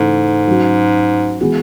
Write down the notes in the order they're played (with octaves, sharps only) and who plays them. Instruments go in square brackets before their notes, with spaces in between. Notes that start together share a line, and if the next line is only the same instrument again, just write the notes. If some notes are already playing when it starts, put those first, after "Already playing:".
Already playing: [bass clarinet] G#2 [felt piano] C#3 E3 A3
[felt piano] F#3 C#4 F#4
E3 G#3 B3 F#4